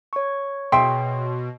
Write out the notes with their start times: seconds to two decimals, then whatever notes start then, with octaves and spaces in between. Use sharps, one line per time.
0.13 C#5 C#6
0.72 B2 G#4 E5 G5 C6